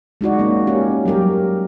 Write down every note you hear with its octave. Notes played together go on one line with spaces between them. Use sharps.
G#3 D#4 F#4 D5
A#3 C#4
C#4 G4
F#3 G3 G4 A#4